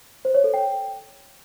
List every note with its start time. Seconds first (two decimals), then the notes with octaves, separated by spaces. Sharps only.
0.25 C5
0.34 C#5
0.44 A4
0.54 G5